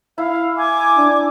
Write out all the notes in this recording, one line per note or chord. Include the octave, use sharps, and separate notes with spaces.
E4 F5
G#5 D6
D4